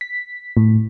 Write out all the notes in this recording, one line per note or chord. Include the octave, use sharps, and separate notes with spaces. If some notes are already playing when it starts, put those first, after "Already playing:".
B6
A2